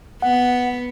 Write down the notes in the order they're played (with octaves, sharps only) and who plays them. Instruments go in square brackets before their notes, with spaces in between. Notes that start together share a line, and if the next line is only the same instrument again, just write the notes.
[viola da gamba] B3 [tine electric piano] F#5